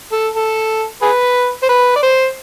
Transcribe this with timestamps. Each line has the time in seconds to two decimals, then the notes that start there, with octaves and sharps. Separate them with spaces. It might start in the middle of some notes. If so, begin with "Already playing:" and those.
0.12 A4
0.36 A4
1.02 G#4 B4
1.63 C5
1.69 B4
1.96 D5
2.03 C5